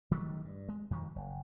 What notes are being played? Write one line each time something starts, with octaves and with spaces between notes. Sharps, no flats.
D#3 F#3 G3 A3
G2
G#3
F2 D#3 F3 F#3
F#1